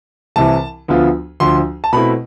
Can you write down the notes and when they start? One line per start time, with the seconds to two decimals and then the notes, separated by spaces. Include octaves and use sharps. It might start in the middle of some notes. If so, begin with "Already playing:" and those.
0.36 C2 C3 E3 A5
0.88 D2 D3 F3 B3 F4
1.40 D2 D3 F3 C6
1.84 A5
1.93 B2 A3 C4 E4 B5